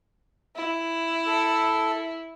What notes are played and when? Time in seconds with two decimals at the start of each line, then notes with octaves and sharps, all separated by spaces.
0.55 E4
1.27 A4